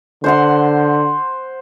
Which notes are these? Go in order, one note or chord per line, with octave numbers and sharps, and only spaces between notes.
D3 C5 F#5 C6